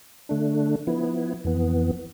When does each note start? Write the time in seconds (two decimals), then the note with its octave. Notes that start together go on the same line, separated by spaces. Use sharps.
0.29 D3 A3 D4
0.87 F3 B3 E4
1.44 F2 E3 B3